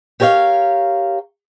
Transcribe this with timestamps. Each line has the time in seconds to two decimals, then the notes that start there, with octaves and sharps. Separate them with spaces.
0.20 G4 A#4 C#5 E5 F5